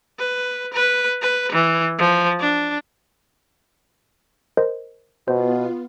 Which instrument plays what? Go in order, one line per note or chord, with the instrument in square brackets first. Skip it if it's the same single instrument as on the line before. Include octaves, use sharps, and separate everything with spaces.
[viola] B4
B4
B4
E3
F3
D4
[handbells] A#4 C5 D#5
[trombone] B2 [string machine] B3 F4 [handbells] C5